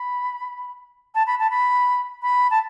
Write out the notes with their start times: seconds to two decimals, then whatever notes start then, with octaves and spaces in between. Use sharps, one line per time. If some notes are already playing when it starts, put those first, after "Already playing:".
Already playing: B5
1.15 A5
1.27 B5
1.39 A5
1.50 B5
2.22 B5
2.51 A5